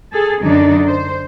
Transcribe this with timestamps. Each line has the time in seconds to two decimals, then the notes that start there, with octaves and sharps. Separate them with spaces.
0.12 G#4 A4
0.43 F#2 D3 D4 D#4
0.87 C5